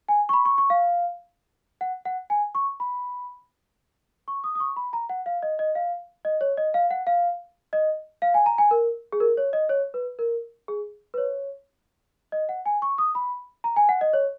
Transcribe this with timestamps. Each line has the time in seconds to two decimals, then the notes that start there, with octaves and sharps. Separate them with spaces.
0.09 G#5
0.29 C#6
0.33 B5
0.45 C#6
0.58 C#6
0.70 F5
1.81 F#5
2.05 F#5
2.30 G#5
2.55 C#6
2.80 B5
4.28 C#6
4.44 D#6
4.55 D#6
4.60 C#6
4.76 B5
4.93 A#5
5.09 F#5
5.26 F5
5.43 D#5
5.59 D#5
5.75 F5
6.25 D#5
6.41 C#5
6.57 D#5
6.74 F5
6.91 F#5
7.07 F5
7.73 D#5
8.22 F5
8.34 G#5
8.46 A#5
8.58 G#5
8.71 A#4
9.12 G#4
9.20 A#4
9.37 C#5
9.53 D#5
9.69 C#5
9.94 B4
10.19 A#4
10.68 G#4
11.14 B4
11.18 C#5
12.32 D#5
12.49 F#5
12.66 G#5
12.82 C#6
12.98 D#6
13.15 B5
13.64 A#5
13.76 G#5
13.89 F#5
14.01 D#5
14.13 C#5